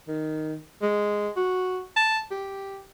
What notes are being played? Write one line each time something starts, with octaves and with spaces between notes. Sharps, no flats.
D#3
G#3
F#4
A5
G4